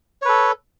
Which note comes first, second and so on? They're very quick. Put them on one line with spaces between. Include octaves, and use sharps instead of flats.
C#5 B4 A4